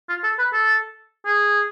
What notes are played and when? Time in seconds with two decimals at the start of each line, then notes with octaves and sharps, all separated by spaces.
0.09 F4
0.24 A4
0.39 B4
0.53 A4
1.26 G#4